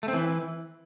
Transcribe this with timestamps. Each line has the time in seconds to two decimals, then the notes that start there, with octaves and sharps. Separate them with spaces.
0.03 A3
0.08 C4
0.13 E3